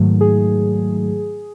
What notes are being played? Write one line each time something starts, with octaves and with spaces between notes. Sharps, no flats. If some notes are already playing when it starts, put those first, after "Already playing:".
Already playing: G#2 D#3 F#3 A3
G#4